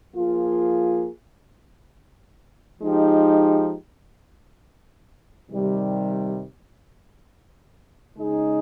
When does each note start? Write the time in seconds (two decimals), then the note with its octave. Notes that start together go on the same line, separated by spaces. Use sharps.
0.12 F3 A#3 F4 G#4
2.81 F3 G#3 D#4 G4
5.49 C3 D#3 G3
8.16 C#3 G#3 D#4 G#4